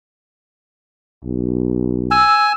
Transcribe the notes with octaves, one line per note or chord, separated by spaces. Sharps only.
B1
G#5 E6